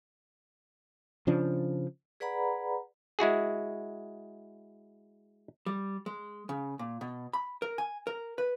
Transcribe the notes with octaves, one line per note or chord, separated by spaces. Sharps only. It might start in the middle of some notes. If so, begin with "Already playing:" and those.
C#3 F3 D4
G#4 B4 D5 F#5 A#5 B5
G#3 E4 F#4 G#4
G3
G#3
C#3
A#2
B2
B5
A#4
G#5
A#4
B4